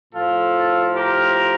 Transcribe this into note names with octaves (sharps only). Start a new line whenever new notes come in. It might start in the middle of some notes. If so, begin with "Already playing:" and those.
A2 F3 F4 A4
G4 A#4